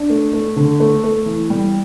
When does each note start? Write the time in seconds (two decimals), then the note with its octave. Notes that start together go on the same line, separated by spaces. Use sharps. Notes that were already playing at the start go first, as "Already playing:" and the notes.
Already playing: D4
0.10 A3
0.33 A3
0.56 D3
0.80 A3
1.04 A3
1.26 E3
1.50 G3